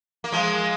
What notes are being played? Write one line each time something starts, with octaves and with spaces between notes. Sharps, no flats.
A#3
F3 G#3